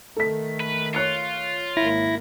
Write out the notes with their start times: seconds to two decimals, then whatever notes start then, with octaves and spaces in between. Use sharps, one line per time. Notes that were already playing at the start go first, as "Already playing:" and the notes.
0.17 D#3 A3 A4 B6
0.60 B4
0.95 F4 C#5 F#6 C#7
1.77 G#1 A#3 E4 A#6